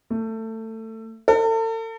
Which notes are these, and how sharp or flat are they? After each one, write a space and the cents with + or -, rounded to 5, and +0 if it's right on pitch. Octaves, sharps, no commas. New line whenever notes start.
A3 +20
A4 +40